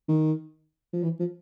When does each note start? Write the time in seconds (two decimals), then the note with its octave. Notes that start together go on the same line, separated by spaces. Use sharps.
0.09 D#3
0.93 F3
1.04 E3
1.20 F3